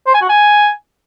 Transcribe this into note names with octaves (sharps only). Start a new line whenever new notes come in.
C5
G#5
F#4
G#5